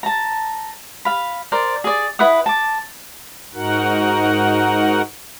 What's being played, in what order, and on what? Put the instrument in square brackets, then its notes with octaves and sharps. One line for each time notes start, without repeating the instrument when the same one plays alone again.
[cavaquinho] A5 A#5
F5 B5
A#4 C5 D5
G#4 D5
E4 B4 F#5 D#6
A5 D6
[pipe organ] G#2 D#4 F#4 A#4 F#5